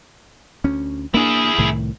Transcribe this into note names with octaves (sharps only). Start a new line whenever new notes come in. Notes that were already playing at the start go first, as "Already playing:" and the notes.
D2 C#4
A#3 D4 E4 G#4
C2 A2 D#3